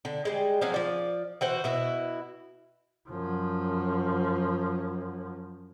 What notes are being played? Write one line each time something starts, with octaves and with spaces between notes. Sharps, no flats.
D3
G3 G#3
F3 F#3 C#4
F3 D5
E3 F#4 C5
B2 E4 F#4
F#2 F3